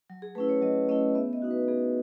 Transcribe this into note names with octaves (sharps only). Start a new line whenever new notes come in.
F#3
G#4
A3 C#4 E4 B4
C#5
F#3 D#5
A3 C#4 E4 D#5
B3 E5
D#5
D#4 F#4
B4
B3 G#4